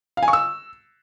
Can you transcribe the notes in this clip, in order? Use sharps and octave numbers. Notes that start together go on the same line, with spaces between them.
F5
G#5
C#6
E6